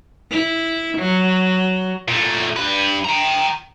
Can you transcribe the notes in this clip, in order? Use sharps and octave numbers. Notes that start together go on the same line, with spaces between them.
E4
F#3
A#2 A3
G2 B4
G5 A#5